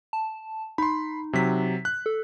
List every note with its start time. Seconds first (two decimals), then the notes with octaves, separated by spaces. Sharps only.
0.13 A5
0.78 D#4 B5 C6
1.33 C3 F#3 B6
1.85 F#6
2.06 A4